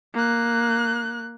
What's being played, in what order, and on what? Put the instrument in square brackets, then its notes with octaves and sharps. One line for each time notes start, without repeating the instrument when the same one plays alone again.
[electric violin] A#3 F#6